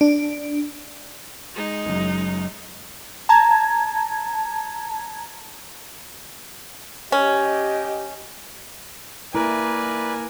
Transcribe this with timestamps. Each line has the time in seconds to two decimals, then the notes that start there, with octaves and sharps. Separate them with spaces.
0.01 D4
1.54 G#3 D#4
1.86 F#1 F#2
3.29 A5 A#5 G#6
7.12 C#4 G4 D#5
9.35 A#3 E4 A#4 B4 D5 G#5